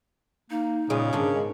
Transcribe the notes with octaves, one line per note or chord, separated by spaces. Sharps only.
A#3 D#4
A#2 C#3 G#3 B3
G#2 D#3 C#4 D4
G#3